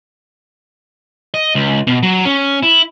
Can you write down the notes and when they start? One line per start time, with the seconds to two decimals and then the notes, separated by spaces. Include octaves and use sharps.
1.34 D#5
1.55 C#2
1.87 B2
2.03 F#3
2.25 C#4
2.63 E4